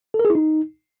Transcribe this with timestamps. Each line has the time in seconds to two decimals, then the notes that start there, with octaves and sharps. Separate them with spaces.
0.14 A4
0.19 A#4
0.25 G#4
0.30 E4
0.35 D#4